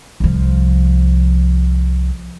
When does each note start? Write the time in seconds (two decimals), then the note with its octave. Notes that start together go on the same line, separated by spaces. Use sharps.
0.20 C2 F3